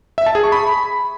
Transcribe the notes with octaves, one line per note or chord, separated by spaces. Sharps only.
E5
A5
G#4
C#6
B5